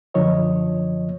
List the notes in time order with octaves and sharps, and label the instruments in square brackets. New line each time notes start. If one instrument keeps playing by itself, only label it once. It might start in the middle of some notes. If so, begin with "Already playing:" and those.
[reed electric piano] F#2 D3 F3 C#5 D#5